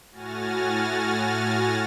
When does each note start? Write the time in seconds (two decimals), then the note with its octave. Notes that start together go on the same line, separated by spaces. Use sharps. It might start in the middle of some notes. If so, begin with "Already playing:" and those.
0.12 A2 F#4 G#5 F6 A6 A#6